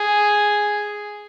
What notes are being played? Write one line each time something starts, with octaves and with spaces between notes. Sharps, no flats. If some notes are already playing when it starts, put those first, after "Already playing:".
Already playing: G#4